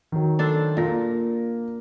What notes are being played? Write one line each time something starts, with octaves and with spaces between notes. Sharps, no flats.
D#3 F#3
D4 A4 C5
A#2 A#3 A#6